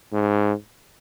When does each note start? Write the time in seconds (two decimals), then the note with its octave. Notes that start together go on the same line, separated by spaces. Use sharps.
0.12 G#2